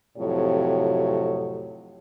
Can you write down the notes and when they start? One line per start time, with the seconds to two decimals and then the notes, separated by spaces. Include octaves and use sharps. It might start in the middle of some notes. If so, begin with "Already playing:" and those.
0.17 F2 A2 C3 F#3 G4 C#5